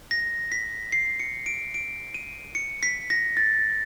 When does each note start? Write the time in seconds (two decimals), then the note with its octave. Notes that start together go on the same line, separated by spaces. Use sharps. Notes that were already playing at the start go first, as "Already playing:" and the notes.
0.11 A#6
0.52 B6
0.92 C7
1.20 C#7
1.46 D7
1.74 D7
2.14 D#7
2.55 C#7
2.83 B6
3.10 A#6
3.37 A6